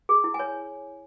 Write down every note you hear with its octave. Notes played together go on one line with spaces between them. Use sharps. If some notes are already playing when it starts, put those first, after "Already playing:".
G#4
E4
G#5
C#5